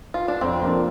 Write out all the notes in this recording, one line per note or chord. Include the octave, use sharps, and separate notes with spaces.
F4
D4
F2 C4
F3 A#3 D4